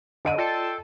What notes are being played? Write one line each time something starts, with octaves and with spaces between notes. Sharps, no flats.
D3 D#5 D7 D#7
F4 A4 D5 G5 A5 C6